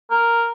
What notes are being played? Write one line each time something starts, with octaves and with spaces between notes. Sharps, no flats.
A#4